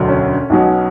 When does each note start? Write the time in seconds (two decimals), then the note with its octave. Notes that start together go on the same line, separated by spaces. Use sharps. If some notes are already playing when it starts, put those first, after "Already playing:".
Already playing: E1 D2 D3 F#3
0.08 C#4
0.50 B1 B2 F#3